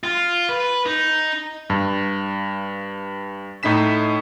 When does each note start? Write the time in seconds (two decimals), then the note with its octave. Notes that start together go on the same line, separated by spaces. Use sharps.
0.04 F4
0.49 B4
0.86 D#4
1.70 G2
3.63 A2 D#4 E4 B6 E7